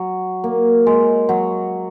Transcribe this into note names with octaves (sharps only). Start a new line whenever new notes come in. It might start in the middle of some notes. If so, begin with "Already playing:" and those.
Already playing: F#3
A#3
G#3
F#3